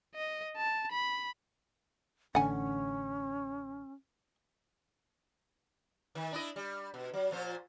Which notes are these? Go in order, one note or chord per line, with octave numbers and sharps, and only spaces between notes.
D#5
A5
B5
A1 D3 C#4 F#5 G#5
D#3
D4 E4 D#5
G3
B2
F#3
A#2 F3 C5